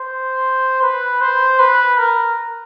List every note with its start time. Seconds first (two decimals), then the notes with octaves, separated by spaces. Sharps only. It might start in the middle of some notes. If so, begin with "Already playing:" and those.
Already playing: C5
0.82 B4
1.21 C5
1.60 B4
1.98 A#4